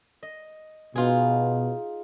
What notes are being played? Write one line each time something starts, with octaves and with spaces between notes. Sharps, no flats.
D#5
B2 D#4 F4 G#4